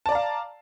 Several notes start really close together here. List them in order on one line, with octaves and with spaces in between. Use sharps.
A5 D5 A#5 F5